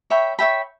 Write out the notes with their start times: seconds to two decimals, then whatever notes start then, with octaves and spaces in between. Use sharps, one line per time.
0.10 C#5 E5 G5 B5
0.39 C#5 E5 G5 B5